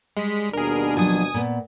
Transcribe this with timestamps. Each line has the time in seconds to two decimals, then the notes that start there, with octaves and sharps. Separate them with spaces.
0.17 G3 G#3 B6
0.53 D#2 B2 D4 G#4 A#4
0.97 F3 F#3 G#5 D#6
1.34 A#2 B3